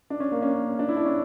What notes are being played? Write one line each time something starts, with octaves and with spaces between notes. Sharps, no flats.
D4
C#4
A#3
C#4
D4
E4
D4
C#4